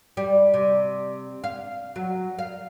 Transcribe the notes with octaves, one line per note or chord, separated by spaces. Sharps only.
G3
C3
F5
F#3
F5